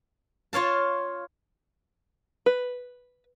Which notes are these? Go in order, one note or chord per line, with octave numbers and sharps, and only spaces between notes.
F4 C#5 F5 A5
B4